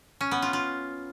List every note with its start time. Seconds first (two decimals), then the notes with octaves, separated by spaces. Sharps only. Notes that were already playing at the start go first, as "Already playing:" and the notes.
0.21 C#4
0.31 B3
0.42 F4
0.53 F4